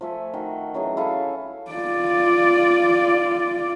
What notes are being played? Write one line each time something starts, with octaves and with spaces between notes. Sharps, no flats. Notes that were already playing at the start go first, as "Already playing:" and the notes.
F3 A3 E5 G#5
D#3 F#4
E3 F#3 C#4 G#4
E4 A4 F5 G#5
F4 D5